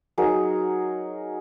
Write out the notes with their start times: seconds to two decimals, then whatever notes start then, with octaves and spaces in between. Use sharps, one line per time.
0.18 F#3 D#4 G#4 A#4